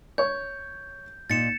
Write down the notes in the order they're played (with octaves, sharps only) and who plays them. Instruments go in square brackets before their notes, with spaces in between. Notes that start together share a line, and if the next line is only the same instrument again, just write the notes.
[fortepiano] C#5 C#6 [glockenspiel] G6
[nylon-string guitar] A#2 D#4 [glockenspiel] A6 C#7 E7